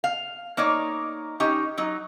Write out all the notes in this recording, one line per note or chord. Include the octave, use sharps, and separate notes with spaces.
F5
A#3 D#4 C#5 D5
C#4 D#4 G4
F#3 D#4